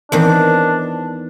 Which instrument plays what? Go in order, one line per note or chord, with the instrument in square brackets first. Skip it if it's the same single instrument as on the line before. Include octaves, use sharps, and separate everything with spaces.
[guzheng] E2 D#3 C4 [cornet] D4